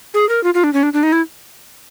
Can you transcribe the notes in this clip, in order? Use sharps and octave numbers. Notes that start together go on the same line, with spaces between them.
G#4
A#4
F4
F4
D4
C#4
D4
D4
D#4
E4